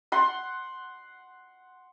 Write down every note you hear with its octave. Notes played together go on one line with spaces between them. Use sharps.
F#5 C6